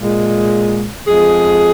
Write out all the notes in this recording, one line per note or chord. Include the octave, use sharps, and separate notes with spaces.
A#2 G#3
F2 F3 G#3 G#4